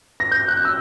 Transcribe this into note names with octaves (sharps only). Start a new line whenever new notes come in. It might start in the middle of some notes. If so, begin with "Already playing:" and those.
A#6
G6
F#6
E6